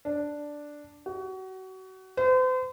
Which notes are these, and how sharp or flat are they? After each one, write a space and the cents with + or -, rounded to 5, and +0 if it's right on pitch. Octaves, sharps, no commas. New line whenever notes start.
D4 +0
F#4 +30
C5 -40